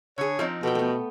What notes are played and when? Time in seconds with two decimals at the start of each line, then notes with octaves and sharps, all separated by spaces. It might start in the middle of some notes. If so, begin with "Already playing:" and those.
0.18 D3 G#4 C#5
0.39 F3 C4 D#4 A#4
0.63 B2 A4 G5
0.75 A3 B3